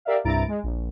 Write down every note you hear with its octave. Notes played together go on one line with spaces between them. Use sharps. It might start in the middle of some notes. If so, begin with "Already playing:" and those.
G4 A#4 D5 E5 F5
C2 G2 E4 A#5 A6 D7
G#3
A#1